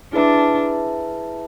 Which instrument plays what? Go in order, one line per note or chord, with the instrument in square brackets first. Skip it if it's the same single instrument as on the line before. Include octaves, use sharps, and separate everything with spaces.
[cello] D4 [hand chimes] E4 G#4 B4 E5 A5